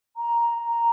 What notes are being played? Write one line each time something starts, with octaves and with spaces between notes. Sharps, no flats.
A#5
A#5